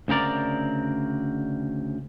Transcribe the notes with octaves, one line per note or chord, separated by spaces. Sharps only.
D2 C#3 C4 A#4 D5